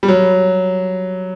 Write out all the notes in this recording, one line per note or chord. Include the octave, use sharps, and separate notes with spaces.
G3
F#3